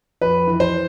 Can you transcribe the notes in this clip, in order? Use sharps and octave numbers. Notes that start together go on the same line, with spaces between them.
F2 B4
E3
C5